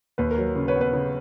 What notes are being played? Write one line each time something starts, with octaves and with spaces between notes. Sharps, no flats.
D#2 B4
A#4
F#3
C#3
B4 C#5
B3
B4 C#5
C#3